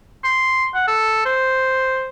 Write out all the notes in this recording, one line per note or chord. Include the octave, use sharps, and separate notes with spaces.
C6
F#5
A4
C5